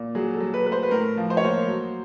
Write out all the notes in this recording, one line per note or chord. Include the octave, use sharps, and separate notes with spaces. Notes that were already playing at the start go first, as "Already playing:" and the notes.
Already playing: A#2
F#3 G#4
A4
F#3
B4
A3 B4
C5
B4
A2 A#4
F3
C5
C#5
A#3 C5
F#3